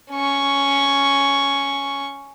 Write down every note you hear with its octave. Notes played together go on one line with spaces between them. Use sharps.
C#4 C#6